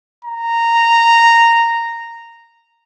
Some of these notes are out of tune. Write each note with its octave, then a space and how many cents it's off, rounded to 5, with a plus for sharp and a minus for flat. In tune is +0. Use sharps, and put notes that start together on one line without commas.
A#5 -10